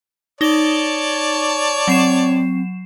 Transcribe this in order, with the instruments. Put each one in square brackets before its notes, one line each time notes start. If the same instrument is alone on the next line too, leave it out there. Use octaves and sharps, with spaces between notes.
[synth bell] D#4 G7 [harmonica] C#5 D5 A5
[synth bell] F#3 C7 E7 [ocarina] C4